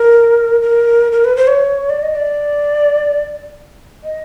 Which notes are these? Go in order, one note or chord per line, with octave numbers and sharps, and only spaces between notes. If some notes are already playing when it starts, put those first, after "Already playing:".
Already playing: A#4
A#4
A#4
B4
C5
C#5
D5
D#5
D5
D#5